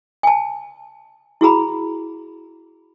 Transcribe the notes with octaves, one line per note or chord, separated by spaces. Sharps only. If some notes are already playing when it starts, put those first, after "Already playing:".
G#5 A5
E4 F#4 G#4 A#5 B5